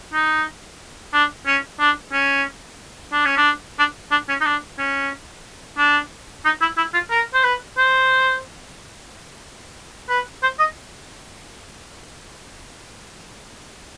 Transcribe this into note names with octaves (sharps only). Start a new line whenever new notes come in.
D#4
D4
C#4
D4
C#4
D4
C#4
D4
D4
D4
C#4
D#4
D4
C#4
D4
D#4
E4
E4
F4
A#4
C5
B4
C5
B4
C5
D#5